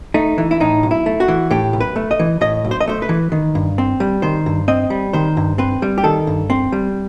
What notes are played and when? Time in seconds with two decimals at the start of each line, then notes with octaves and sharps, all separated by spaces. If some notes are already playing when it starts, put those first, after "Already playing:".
0.14 A3 D#4
0.38 E3
0.51 E4
0.60 A2 D#4
0.83 B1
0.91 E4
1.06 A3
1.20 F#4
1.28 E3
1.50 A2 G4
1.73 B1
1.80 B4
1.96 A3
2.11 D#5
2.19 E3
2.41 A2 D#5
2.65 B1
2.71 C5
2.81 D#5
2.87 A3 C5
3.02 B4
3.09 E3
3.32 D#3
3.55 G2
3.78 C4
4.00 G3
4.22 D#3 C5
4.46 G2
4.68 C4 D#5
4.90 G3
5.13 D#3 C5
5.37 G2
5.58 C4 B4
5.82 G3
5.98 G4
6.04 D#3 A4
6.27 G2
6.50 C4
6.72 G3